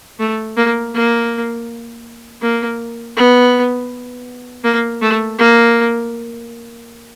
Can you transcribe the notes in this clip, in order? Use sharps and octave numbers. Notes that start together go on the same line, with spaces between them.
A3
A#3
A#3
A#3
B3
A#3
A3
A#3